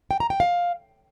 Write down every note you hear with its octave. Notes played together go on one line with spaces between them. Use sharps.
G5
A#5
G5
F5